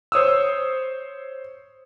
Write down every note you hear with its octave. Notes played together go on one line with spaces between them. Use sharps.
C5 C#5 D#6 E6